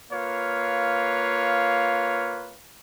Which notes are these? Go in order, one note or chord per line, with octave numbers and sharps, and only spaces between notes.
A#3 F4 B4 C#5 F5